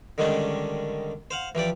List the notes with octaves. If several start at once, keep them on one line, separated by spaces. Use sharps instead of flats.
D3 D#3 G3 G#3 C#4 D4
C5 F5 F#5
E3 F3 G4 D5